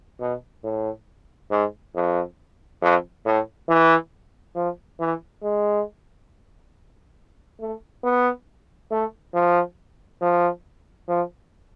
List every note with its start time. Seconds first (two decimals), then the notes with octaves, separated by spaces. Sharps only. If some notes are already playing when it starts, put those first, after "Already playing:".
0.20 B2
0.64 A2
1.51 G#2
1.95 F2
2.82 F2
3.25 A2
3.69 E3
4.55 F3
5.00 E3
5.43 G#3
7.60 A3
8.04 B3
8.91 A3
9.34 F3
10.22 F3
11.08 F3